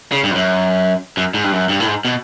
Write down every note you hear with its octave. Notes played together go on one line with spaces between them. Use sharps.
C#3
G2
F2
F#2
F#2
G#2
G2
F#2
G2
A2
G#2
B2